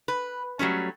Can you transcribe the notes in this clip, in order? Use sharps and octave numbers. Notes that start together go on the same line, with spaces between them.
B4
F#3 G3 A3 C#4